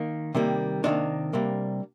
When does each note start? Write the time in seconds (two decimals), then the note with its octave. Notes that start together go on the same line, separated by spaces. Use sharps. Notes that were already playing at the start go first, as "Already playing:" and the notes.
Already playing: D#3 A#3
0.35 C3 D#3 G3 A#3
0.84 C3 D#3 G3 A#3 D4
1.33 C3 G3 A#3